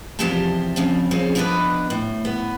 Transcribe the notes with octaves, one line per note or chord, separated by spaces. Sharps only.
E2 C3 F3 G4 C5 A5
C#3 F3 C4
C#3 F3 C4 C#4 G#4
F3 B3 D4 F#4 B4 D#5
A2
B3